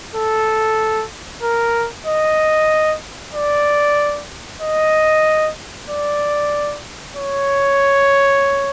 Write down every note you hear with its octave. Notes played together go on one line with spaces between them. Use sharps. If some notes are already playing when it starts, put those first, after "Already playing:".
A4
A#4
D#5
D5
D#5
D5
C#5